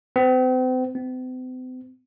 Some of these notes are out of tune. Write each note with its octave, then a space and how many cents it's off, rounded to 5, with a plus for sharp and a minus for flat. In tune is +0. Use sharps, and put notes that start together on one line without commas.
C4 -40
C4 -45